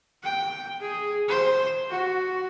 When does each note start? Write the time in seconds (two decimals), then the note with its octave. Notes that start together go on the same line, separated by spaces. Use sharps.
0.23 G5
0.80 G#4
1.29 C5
1.90 F#4